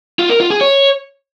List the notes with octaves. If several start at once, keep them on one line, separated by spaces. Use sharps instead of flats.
F4
A#4
F4
G#4
C#5